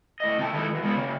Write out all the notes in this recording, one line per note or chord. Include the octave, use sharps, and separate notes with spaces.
A2 D#5
C3 F3 A3 D5 G5 A5
D#3 F3 G#3 E4 A4
E3 F#4
G#3 B3 F4
C#3 A#3